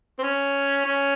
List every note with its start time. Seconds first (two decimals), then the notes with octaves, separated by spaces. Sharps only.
0.18 C4
0.23 C#4
0.85 C#4